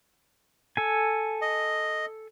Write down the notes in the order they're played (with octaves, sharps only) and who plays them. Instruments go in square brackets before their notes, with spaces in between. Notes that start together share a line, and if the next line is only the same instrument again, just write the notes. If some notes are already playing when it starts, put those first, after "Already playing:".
[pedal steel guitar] A4 G#5
[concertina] D#5